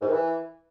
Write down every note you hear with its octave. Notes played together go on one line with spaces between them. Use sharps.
G#2
D#3
E3